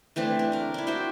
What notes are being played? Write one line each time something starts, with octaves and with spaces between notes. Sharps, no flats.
E3 A3 C4 D4
D4
D4 A#4
D4 E4
F#4 C5 E5 G5